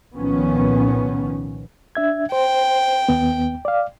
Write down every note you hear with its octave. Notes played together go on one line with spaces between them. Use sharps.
C2 A#2 D#3 F3 B3 C#4
D4 E5 G#6
C5 G5
D#2 B3
D5 F5